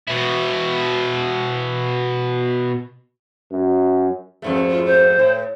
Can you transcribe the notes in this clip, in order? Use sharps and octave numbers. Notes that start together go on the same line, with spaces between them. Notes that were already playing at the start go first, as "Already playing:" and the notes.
B2 E4
F#2
F2 G#2 A3
F4
C5
A2